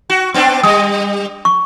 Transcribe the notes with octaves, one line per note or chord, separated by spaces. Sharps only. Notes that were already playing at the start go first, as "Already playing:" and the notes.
F#4
B3 C4 D4
G3 D#6
C#6